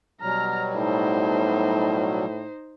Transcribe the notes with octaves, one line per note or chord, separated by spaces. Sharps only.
B2 F#3 G3 A#5 F6
A2 D#4 C5